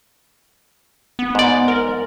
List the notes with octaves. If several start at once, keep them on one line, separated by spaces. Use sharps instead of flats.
B3
G#2 D5
A#4